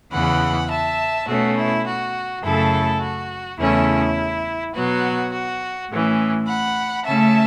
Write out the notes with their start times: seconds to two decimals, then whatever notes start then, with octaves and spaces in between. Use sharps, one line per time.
0.12 E2 C#3 E3 F#5 B5
0.70 E5 A5
1.27 B2 A3 C#4 F#4
1.56 E4
1.85 F#4
2.42 F#2 C#3 A3 E4 A4
3.00 F#4
3.58 E2 C#3 A3 C#4 E4
4.74 B2 F#3 B3 F#4
5.31 F#4
5.89 A2 E3 C#4
6.47 F#5 B5
7.05 C#3 A3 C#4 E5 A5